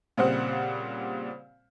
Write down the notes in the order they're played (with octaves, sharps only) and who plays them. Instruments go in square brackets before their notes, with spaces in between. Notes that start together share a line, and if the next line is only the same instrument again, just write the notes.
[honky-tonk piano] A#2 C#3 G3 C4 C5 F#5